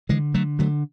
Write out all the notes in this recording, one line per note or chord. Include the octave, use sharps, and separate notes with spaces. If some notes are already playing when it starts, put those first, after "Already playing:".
D3 E3 G#3
D3 F#3 A3
D3 F#3 A3